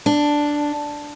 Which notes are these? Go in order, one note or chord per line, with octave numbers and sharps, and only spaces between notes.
D4